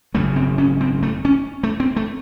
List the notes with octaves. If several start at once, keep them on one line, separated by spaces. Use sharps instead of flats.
G#1 F#2 C#3 A3
C4
C#4
C4
A3
C#4
A3
C4
A3